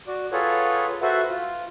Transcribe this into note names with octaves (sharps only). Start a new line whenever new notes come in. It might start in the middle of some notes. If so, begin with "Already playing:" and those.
F#4 D5
F4 G#4 A4 B4 C#5 F#5
F#4 A4 B4 C5 E5 F#5
F4